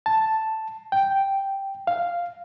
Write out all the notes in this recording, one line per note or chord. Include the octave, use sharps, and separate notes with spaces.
A5
G5
F5